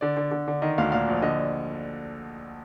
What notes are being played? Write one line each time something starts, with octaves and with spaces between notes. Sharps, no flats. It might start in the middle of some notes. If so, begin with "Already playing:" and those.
D3 D5
D3
D3
D3
D#3 D#5
D2 F5
A#2 F5
A#1
D3 D#5